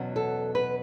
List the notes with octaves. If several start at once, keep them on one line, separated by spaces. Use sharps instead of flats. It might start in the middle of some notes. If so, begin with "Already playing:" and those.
Already playing: E2 B2 F#3 C#4
A4
B4